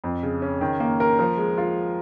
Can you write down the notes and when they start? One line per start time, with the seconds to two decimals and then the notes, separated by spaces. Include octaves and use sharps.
0.04 F2
0.23 C#3
0.42 C#4
0.61 D#3
0.80 A#3
1.00 A#4
1.19 F3
1.37 G#3
1.57 F4